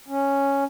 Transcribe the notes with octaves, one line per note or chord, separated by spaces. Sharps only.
C#4